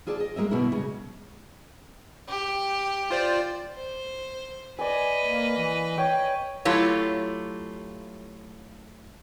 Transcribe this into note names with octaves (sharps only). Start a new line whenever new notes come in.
F4 G#4 A4 D5 E5 A5
D#5
G#3 A#3 D#5 E5
F#2 B2 D3 A#3 B3 E4
C#3 G#3
G4
F4 C5 D5
C5
B4 D5 D#5 G#5
A#3
E3
C#5 G5
F#3 A3 E4 F4 G4 C#5